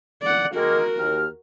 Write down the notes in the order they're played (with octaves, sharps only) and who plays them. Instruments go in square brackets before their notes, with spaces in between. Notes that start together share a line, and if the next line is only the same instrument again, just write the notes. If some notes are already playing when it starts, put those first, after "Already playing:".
[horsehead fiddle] D5 F#5
[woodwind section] D#3 G#3 A#3 [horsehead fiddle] F#4 A#4
[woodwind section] D#2 F6